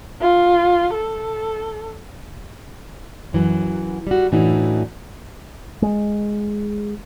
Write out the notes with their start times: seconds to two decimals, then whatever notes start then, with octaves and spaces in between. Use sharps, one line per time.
0.22 F4
0.94 A4
3.33 F#2 E3 F#3
4.07 G3 F#4
4.32 F#2 A2 E3 D4 D#4 F#4
5.82 G#3